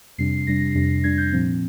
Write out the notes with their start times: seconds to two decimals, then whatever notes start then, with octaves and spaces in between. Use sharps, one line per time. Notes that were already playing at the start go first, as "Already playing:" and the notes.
0.18 F2 C3 G3 D4 C7
0.47 F2 C3 G3 D4 A#6
0.75 F2 C3 G3 D4
1.04 F2 C3 G3 D4 G#6
1.18 G6
1.32 A#2 F3 C4